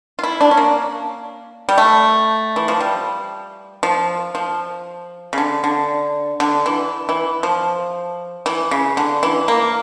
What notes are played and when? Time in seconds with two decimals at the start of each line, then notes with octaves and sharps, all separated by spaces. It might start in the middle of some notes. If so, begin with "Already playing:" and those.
0.19 F4
0.23 E4
0.41 D4
0.51 C#4
0.57 A#3
1.69 G3
1.78 A3
2.56 E3
2.68 F3
2.80 G3
3.83 F3
4.35 F3
5.33 C#3
5.38 D3
5.64 D3
6.40 D3
6.66 E3
7.09 E3
7.43 F3
8.46 E3
8.71 C#3
8.97 D3
9.23 E3
9.48 A#3